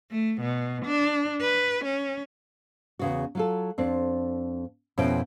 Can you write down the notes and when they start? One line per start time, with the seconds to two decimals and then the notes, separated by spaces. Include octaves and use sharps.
0.10 A3
0.41 B2
0.85 D4
1.41 B4
1.85 C#4
2.99 E2 C#3 F#4
3.35 F#3 F4 A4
3.78 F2 C4 D4
4.98 F2 B2 C#4 E4 G5